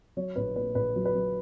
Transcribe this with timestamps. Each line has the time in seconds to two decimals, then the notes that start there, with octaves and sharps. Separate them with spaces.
0.17 F#3 C#5
0.36 A#1 B4
0.56 A#2 B4
0.75 A#1 B4
0.96 F#3
1.05 B4
1.15 F#3